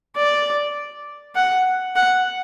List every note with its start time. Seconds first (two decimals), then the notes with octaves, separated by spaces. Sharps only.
0.16 D5
1.35 F#5
1.96 F#5